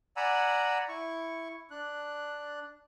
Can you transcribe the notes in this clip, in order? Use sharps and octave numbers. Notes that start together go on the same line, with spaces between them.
D5 F#5 G#5 A#5 B5 E6
E4 C#6
D4 F#6